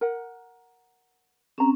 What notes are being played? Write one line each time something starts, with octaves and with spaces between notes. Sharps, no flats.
A#4 F#5
C4 C#4 G#4 A#5